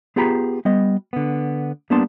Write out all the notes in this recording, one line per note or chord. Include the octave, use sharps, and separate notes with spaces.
B3 F4 G4 G#4 A#5 B5
G3 B3 D#5
D3 B3
G3 A#3 B3 D4 A5 C6